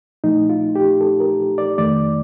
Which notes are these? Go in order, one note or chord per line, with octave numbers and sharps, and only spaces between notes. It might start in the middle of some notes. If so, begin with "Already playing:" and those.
A#2 F3 A3 D#4
F4
G4
A4
A#4
D5
F2 D#3 A3 D5